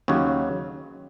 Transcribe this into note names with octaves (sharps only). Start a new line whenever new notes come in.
D#2 C#3 F#3